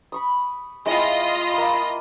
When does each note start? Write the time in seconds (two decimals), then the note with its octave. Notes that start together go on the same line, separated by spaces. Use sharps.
0.12 B5 C#6 D#6
0.86 G#3 E4 F4 D#5 G5
1.54 A#3 B5